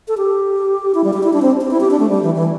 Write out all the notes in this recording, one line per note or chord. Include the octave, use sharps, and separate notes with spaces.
A4
G4
E4
G3
G4
E4
D4
C4
C4
E4
G4
D4
A3
G3
E3
E3